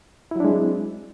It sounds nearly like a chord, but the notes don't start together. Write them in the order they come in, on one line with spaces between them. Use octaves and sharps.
E4 F#3 D4 G#3 C4